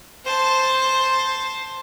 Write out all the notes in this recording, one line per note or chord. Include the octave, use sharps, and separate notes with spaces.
C5 A5